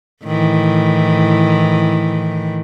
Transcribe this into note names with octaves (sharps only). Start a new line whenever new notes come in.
A2 D#3 E3